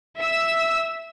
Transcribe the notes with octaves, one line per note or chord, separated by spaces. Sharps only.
E5 E6